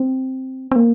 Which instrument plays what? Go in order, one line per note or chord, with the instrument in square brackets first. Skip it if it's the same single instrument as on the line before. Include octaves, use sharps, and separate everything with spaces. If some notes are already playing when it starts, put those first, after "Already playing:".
Already playing: [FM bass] C4
C4
A#3